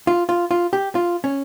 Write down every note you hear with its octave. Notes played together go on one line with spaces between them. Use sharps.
F4
F4
F4
G4
F4
C#4